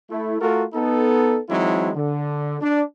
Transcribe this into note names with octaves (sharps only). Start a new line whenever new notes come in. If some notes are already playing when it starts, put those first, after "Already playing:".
A3 E4
A3 F4 F#4 A4 A#4
B3 D#4 A4
E3 F#3 G#3 C4 D#4 E4
D3
D4